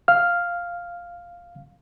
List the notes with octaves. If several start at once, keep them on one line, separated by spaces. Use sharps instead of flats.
F5 F6